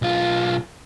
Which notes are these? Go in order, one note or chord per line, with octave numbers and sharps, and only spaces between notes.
B1 F4